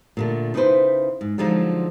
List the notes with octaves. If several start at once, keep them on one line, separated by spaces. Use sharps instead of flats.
A#2 D3 A3
C#3 D#4 E4 G#4 B4 C5
G#2
D3 F3 F#3 G#3 D#4 F4